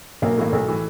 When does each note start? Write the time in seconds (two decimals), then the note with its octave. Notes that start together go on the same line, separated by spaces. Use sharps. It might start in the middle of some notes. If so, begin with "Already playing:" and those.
0.22 B1 A#3
0.38 A2 E3 A#3
0.53 B1 A3
0.68 A2 E3